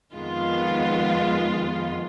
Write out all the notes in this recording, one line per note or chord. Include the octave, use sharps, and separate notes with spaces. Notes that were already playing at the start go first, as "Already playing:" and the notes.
F2 D#3 G#3 B3 F4